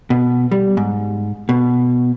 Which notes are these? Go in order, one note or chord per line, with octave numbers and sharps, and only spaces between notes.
B2
G3
G#2
B2